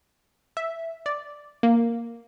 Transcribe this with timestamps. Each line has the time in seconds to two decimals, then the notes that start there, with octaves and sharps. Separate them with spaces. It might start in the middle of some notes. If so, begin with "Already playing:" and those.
0.57 E5
1.06 D5
1.63 A#3